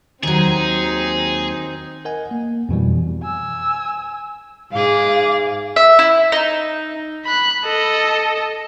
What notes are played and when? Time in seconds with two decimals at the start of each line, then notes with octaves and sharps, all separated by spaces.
0.23 D#2 F#3 C4 D#4 G#4
2.05 A#4 D#5 F#5 G#5
2.31 A#3
2.69 F2 B2 E3 G3
3.23 G#5 E6
4.72 G#2 G#4 F5 D6
5.76 E5
5.99 E4
6.32 D#4
7.25 B5 F#6
7.65 A4 D#5